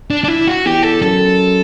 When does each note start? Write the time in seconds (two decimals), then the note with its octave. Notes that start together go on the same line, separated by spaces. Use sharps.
0.10 D4
0.24 D4
0.28 E4
0.47 F#4
0.65 E2 G4
0.83 A4
1.02 F#2 A4